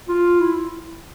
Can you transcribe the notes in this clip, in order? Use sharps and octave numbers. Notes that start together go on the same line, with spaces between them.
F4
E4